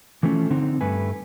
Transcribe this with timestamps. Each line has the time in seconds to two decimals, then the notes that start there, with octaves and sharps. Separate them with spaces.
0.23 E3 F3 A3 C#4
0.50 D3 C4 D#4
0.81 G2 A3 B4 G#5